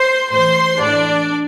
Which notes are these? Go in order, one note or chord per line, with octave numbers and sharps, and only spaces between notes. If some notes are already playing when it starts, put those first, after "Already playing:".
Already playing: C5 C6
A2 E3 C5 C6
A2 E3 D4 D5